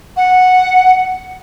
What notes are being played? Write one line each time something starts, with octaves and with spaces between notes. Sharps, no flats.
F#5